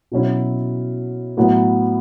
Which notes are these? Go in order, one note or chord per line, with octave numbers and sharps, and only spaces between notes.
B2 F#3 C#4 E4
A2 F#3 B3